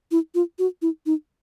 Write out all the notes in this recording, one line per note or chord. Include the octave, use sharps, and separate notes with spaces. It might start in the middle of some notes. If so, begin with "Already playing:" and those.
E4
F4
F#4
E4
D#4